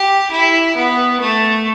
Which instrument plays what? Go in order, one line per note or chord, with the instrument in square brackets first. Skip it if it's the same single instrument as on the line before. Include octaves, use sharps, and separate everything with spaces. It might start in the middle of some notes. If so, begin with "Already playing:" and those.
Already playing: [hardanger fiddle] G4
E4
B3
A3